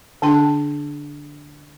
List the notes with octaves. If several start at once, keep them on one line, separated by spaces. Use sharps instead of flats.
D3 D4 G5 C6